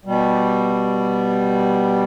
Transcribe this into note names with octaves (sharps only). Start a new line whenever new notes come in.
B2 G3